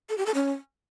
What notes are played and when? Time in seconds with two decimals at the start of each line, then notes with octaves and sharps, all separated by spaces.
0.09 A4
0.18 G4
0.26 A4
0.34 C#4